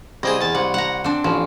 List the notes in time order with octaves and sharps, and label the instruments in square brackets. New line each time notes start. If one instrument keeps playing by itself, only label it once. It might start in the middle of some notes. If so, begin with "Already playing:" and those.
[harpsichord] C2 C4 G#4 [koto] D#5
[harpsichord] E2 A5
[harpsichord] C2 [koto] F#5
[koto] F#5 A#5
C4 D4
[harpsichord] A1 [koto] F3